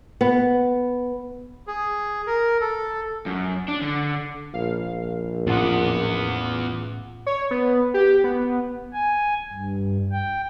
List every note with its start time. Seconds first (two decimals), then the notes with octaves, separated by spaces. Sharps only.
0.21 B3
1.67 G#4
2.27 A#4
2.61 A4
3.26 F#2
3.68 D4
3.82 D3
4.54 A#1 F5
5.47 E2 A2 B3 C#4 F4 F#5 D6
7.27 C#5
7.51 B3
7.94 G4
8.24 B3
8.93 G#5
9.53 G2
10.12 G5